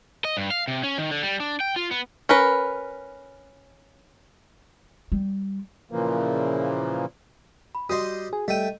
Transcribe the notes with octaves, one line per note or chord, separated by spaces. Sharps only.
D#5
G2
F5
C3
C#4
D#3
D3
G3
D4
G5
F4
B3
C#4 A#4 B4
G3
A#2 C#3 E3 F3 A#3
B5
G3 F#4 C5 D#5 D#6
G#4
G3 A3 D#5 G5 D#7